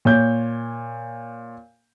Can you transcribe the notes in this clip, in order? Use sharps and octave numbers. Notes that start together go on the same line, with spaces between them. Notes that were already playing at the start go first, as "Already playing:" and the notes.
A#2 C#5 G6